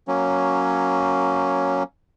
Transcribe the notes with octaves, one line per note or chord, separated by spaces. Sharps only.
F#3 A#3 C#4